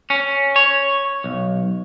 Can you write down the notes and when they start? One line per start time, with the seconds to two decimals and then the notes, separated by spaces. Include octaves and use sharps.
0.10 C#4
0.56 C#5
1.24 B1